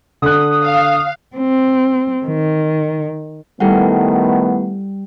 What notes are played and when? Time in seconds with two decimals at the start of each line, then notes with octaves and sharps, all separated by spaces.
0.22 D3 D#6 F#6
0.64 F5
1.37 C4
2.26 D#3
3.60 D#3 G3 A3 B3 E4 A4 F#5